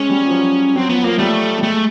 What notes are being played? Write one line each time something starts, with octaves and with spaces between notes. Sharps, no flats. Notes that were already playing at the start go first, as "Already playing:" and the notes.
Already playing: G#3 C#4
G3
F3
F#3
F#3 C4
F3 B3
F3 A#3
G3 A3
G3
G#3 A3